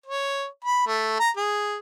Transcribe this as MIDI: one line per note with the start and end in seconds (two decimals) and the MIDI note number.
0.06 0.45 73
0.64 0.83 83
0.87 1.16 57
1.19 1.30 82
1.37 1.76 68